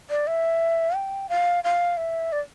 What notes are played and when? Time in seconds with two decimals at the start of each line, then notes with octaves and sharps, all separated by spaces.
0.10 D5
0.27 E5
0.96 G5
1.29 F5
1.64 F5
1.97 E5
2.32 D5